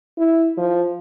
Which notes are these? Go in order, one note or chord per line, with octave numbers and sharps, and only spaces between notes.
E4
F3